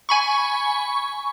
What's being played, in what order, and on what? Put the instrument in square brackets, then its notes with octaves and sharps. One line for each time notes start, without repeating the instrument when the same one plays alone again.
[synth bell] G#5 B5 C#6